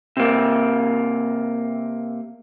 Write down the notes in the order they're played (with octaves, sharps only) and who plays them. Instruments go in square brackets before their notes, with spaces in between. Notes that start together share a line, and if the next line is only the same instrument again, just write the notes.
[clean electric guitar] C3 A#3